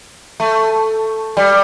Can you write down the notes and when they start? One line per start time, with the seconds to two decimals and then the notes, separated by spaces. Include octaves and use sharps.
0.40 A3
1.37 G3